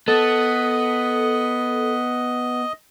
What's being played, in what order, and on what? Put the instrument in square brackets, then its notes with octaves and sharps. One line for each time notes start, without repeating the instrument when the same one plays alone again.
[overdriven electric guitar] B3 [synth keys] A4 [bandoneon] D#5